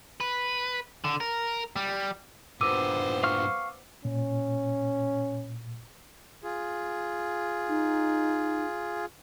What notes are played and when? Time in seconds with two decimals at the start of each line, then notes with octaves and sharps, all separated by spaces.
0.20 B4
1.04 D3
1.20 A#4
1.76 G3
2.61 G2 A#2 B3 C5 D6 E6 D#7
3.23 F5 C#6 F6
4.05 A#2 C#4
6.43 F4 G#4
7.69 D#4